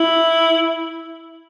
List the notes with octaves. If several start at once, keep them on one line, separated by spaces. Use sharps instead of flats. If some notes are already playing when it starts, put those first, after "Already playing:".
Already playing: E4